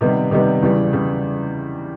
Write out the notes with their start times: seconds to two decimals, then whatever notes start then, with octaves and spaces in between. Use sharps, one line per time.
0.01 C3 D#3 G3 B3
0.31 C3 D#3 G3 B3
0.63 E2 C#3 E3 G3
0.93 C#3 E3 G3